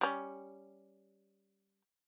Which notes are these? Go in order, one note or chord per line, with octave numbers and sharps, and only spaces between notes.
G3 C#4